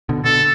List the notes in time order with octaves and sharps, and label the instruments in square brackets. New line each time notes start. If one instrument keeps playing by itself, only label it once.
[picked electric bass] B2 D3
[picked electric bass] B2 D3 [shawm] A4